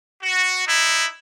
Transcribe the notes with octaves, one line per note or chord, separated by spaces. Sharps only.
F#4
D#4 E4